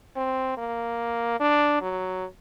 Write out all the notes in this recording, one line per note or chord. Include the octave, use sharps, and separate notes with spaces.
C4
A#3
D4
F#3